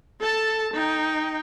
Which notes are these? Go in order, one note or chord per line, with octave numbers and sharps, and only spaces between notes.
A4 A5
D#4 G5